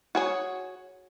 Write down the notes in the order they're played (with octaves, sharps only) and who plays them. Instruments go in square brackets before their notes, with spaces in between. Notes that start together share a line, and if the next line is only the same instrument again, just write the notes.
[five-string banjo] F#4 G#4 C#5